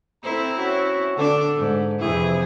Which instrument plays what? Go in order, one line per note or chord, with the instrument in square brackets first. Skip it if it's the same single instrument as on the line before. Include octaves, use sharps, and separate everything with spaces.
[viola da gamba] C4 E4 [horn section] A4 C5 A#5
[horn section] C#4 F#4
[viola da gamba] D3 D4 D5 [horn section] A4
[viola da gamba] G#2
[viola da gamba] F2 C3 G#4 [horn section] E3 E4